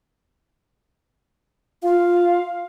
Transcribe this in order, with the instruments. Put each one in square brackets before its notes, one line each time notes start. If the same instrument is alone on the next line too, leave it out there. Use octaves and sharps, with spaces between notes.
[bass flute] F4 [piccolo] F5